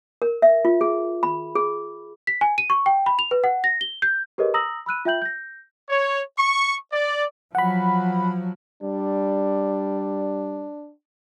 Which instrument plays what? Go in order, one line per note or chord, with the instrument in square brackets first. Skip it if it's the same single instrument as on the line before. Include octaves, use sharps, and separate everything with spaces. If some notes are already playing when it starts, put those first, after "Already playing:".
[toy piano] A#4
E5
F4
G#4
B5
G#4
[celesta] B6
G#5
D#7
C#6
G5
B5
F7
B4
F#5
A#6
G7
G6
G4 G#4 A#4 B4 C#5 D#5
A#5 D#6 E6 A#6 F#7
B5 E6 F#6 D#7
F4 E5 G5 G6 F#7
G6 A#6
[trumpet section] C#5
C#6
D5
[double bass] F3 F#3 [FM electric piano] F#5 B5
[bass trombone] G3 [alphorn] D4